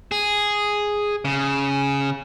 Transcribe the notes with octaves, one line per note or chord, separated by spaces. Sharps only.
G#4
C#3